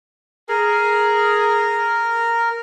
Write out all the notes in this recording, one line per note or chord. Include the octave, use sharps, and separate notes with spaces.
G#4 A#4